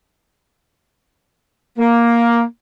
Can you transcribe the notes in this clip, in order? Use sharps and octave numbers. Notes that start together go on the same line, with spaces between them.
A#3